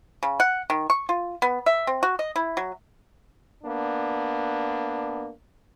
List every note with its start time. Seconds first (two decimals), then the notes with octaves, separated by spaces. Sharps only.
0.23 C#3
0.40 F#5
0.70 D#3
0.90 C#6
1.09 F4
1.42 B3
1.66 E5
1.87 C4
2.03 F#4
2.19 D#5
2.36 E4
2.57 F#3
3.63 A#3 B3 D4